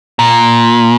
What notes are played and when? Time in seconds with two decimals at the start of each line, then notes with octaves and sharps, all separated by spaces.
0.19 A#2